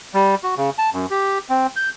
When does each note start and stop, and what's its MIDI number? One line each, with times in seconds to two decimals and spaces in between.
0.14 0.35 55
0.43 0.55 66
0.57 0.70 49
0.78 0.90 81
0.93 1.06 42
1.10 1.38 67
1.50 1.67 60
1.76 1.89 91